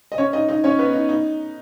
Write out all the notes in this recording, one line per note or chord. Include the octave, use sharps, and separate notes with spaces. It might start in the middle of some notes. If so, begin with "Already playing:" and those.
D#5
C#4 C#5
D#4 D#5
D#4 D#5
C#4 C#5
B3 B4
D#4
D#4